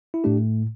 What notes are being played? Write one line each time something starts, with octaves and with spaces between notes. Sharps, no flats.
E4
A2 A3 D4 G4